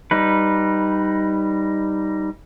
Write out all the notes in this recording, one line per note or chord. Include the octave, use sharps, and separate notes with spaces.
G3 D#4 B4